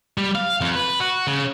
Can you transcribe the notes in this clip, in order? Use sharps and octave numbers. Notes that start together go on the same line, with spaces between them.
G3
F5
F2
B4
F#4
C#3